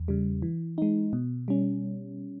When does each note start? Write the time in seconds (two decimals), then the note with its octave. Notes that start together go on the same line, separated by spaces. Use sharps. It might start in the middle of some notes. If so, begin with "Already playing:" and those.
Already playing: E2
0.08 C#3 G3
0.42 E3
0.78 G#3 D#4
1.13 B2
1.48 G3 C#4